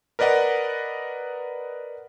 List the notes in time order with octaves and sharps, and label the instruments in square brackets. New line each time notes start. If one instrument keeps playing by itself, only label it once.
[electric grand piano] A#4 B4 D5 D#5 F#5